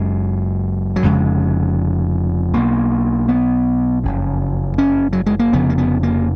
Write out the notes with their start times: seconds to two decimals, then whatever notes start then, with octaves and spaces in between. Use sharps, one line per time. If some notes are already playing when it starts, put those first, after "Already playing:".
Already playing: F#1 F#2 C#3 G#3
0.96 F#3
1.04 F1 F2 C#3 G#3
2.53 B1 B2 A#3
3.28 B3
4.04 F#1 F2 C#3
4.78 C#4
5.13 F#3
5.26 G#3
5.39 A#3
5.53 F1 F2 C#3 B3
5.70 A#3
5.78 B3
6.03 A#3